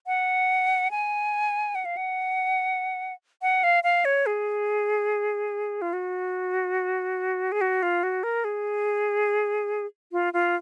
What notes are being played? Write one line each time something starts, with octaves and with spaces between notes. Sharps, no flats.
F#5
G#5
F#5
F5
F#5
F#5
F5
F5
C#5
G#4
F4
F#4
G#4
F#4
F4
F#4
A#4
G#4
F4
F4